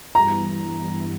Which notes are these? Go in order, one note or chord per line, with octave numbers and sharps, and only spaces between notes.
G2 E3 G3 B3 E4 A#5